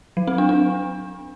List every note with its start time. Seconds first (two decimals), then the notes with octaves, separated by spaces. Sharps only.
0.17 F#3
0.27 C4
0.38 D4
0.49 D4